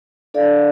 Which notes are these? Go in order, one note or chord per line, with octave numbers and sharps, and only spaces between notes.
D4 A4 D5 F5